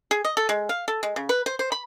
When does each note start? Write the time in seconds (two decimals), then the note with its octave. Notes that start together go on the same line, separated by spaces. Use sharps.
0.11 G#4
0.25 D#5
0.37 A4
0.49 G#3
0.69 F5
0.88 A4
1.03 G#3
1.16 C#3
1.29 B4
1.46 C5
1.59 C5
1.72 B5